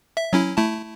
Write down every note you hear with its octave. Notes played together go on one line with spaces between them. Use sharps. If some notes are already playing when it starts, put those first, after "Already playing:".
E5
F#3 C#4 E4
A3 E4 A5